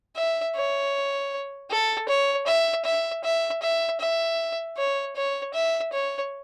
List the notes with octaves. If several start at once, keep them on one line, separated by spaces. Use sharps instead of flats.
E5
C#5
A4
C#5
E5
E5
E5
E5
E5
C#5
C#5
E5
C#5